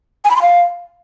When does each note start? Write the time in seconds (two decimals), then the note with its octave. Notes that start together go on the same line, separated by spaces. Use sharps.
0.25 G#5
0.30 B5
0.36 C6
0.42 F5